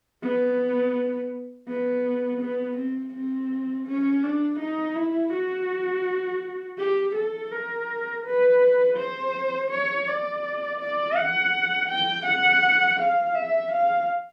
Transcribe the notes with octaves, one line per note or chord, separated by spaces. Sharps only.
B3
B3
B3
C4
C4
C#4
D4
D#4
E4
F#4
G4
A4
A#4
B4
C5
C#5
D5
D5
F#5
G5
F#5
F5
E5
F5